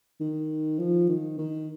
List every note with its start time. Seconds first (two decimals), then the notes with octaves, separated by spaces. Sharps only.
0.20 D#3
0.79 F3
1.09 D#3
1.38 D#3